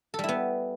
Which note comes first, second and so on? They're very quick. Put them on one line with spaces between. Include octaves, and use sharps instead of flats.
A4 G3 E4 B3